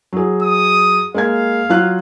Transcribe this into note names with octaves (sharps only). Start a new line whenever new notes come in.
F#3 G#4
D#6
G#3 A#3 F5 G#6
F#3 F4 F#6